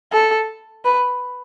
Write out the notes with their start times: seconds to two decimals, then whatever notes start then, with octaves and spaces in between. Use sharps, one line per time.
0.12 A4
0.85 B4